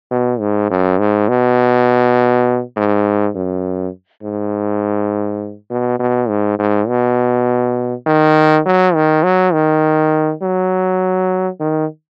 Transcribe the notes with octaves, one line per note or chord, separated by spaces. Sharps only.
B2
G#2
F#2
G#2
B2
G#2
F#2
G#2
B2
B2
G#2
G#2
B2
D#3
F#3
D#3
F#3
D#3
F#3
D#3